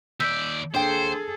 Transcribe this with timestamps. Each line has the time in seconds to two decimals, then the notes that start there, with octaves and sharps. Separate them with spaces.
0.20 D#2 D5 E6 G6 B6
0.74 D#2 D4 G#4 A4 C5 G5